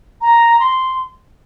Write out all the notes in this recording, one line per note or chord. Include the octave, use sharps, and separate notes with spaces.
A#5
C6